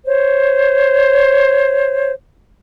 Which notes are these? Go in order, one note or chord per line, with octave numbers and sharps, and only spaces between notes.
C5 C#5